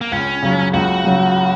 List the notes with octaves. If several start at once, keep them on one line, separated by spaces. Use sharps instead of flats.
A#3
C#2 C#4
C#3 F#3
C#2 F#4
C#3 F#3